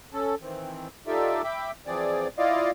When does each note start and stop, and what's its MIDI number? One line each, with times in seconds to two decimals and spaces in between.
0.13 0.35 61
0.13 0.35 69
0.42 0.88 51
0.42 0.88 52
0.42 0.88 60
1.07 1.42 63
1.07 1.42 65
1.07 1.42 67
1.07 1.42 69
1.07 1.42 74
1.07 1.42 76
1.44 1.71 76
1.44 1.71 79
1.44 1.71 83
1.44 1.71 86
1.87 2.28 52
1.87 2.28 53
1.87 2.28 60
1.87 2.28 68
1.87 2.28 74
2.38 2.71 64
2.38 2.71 65
2.38 2.71 74
2.38 2.71 75
2.38 2.71 77